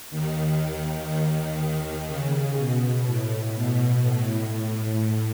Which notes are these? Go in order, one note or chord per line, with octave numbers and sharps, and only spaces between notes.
D#2 D#3
C#3
B2
A2
B2
A2